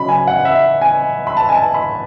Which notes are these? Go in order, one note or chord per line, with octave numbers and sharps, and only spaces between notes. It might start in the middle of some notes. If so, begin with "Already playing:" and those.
Already playing: C#3 F#3 C#4 B5
G#5
F#5
E5
G#5
B5
A5
G#5
A5
B5